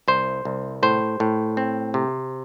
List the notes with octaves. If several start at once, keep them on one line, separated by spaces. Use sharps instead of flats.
C2 C5
C2
A2 C5
A2
C4
C3